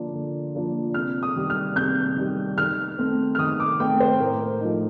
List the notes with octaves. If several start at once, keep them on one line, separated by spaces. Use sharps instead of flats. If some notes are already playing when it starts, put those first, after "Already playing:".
Already playing: D3 F3 A#3 D4 F4
D3
F3 A#3 D4 F4
C3 F6
D#6
D#3 G3
F6
C3 G6
D#3 G3
D#3 F6
A3 C4
F6
D#3 D#6
D6
A3 C4 G5
C5
A2 A#4
F3 A3 D#4